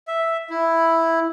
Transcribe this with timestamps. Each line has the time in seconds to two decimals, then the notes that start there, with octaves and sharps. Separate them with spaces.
0.08 E5
0.50 E4